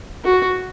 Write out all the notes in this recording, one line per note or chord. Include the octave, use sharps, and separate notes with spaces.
F#4